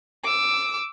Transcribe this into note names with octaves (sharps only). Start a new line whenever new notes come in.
D6 E6